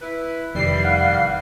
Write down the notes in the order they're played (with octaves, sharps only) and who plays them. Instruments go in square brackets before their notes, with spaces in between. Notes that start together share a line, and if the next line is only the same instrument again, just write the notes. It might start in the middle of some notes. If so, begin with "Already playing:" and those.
[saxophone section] E4 B4
[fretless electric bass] F1 D#3 [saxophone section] E3 G3 [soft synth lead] C7
[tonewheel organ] F5 F#5